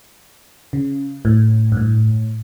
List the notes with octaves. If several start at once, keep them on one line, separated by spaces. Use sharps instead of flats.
C#3
A2
G2
A2